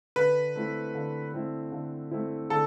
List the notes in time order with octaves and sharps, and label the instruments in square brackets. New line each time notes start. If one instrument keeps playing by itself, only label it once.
[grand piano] D3 [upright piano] B4
[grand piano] A3 C4 E4
D3
A3 C4 E4
D3
A3 C4 E4
[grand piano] D3 [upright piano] A4